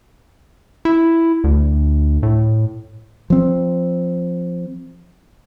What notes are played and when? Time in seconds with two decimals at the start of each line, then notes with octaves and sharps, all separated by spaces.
0.85 E4
1.44 D2
2.23 A2
3.30 F3 C4